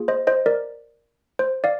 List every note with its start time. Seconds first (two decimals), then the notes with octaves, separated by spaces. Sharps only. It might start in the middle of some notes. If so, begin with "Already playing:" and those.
Already playing: A#3 F4 G#4
0.08 C5 D#5
0.27 C5 D#5
0.46 A#4 D5
1.39 C5
1.64 D5 F5